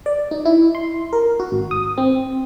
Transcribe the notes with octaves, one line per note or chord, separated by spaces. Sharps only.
D5
D#4
E4
C6
A#4
F#4
G#1
D#6
C4